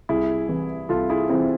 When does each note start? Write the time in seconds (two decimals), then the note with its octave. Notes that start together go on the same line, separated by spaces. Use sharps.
0.09 C2 E4 G#4
0.49 C3 E3
0.89 C2 F4 A4
1.10 E4 G#4
1.29 C3 E3 C4 E4